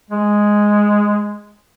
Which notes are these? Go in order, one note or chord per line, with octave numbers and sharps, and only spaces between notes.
G#3